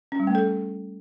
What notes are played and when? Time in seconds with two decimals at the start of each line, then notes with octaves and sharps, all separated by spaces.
0.12 C#4
0.20 G3
0.27 A3
0.35 A4